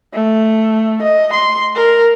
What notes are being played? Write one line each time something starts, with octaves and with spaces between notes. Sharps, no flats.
A3
D#5
C6
A#4